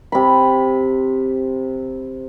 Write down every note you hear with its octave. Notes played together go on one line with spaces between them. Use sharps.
C3 B5